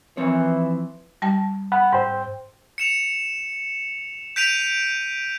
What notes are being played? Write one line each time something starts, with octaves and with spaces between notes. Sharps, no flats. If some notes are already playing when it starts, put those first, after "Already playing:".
E3 F3 C4 C#5
G3 A5
F#5 B5
G#2 C5 G5
C#7 E7 F7
G6 B6 D7 D#7 F7